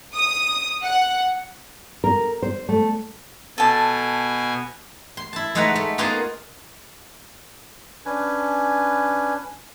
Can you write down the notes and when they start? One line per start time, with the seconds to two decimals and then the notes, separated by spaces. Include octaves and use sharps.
0.15 D#6
0.83 F#5
2.04 A#4
2.42 C5
2.69 A3
3.58 B2 A4 G#5 A5
5.17 C6
5.33 E4 A5
5.55 G#3 A3 D#4 B4 F#5 A#5
5.76 A3
5.98 A#3 B3 D#4 F4 G#4
8.06 C#4 D4 B4 G#5